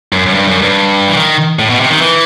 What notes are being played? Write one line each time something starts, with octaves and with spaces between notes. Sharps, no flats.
F#2
F#2
G2
F#2
G2
E3
D#3
A2
B2
C3
D#3
E3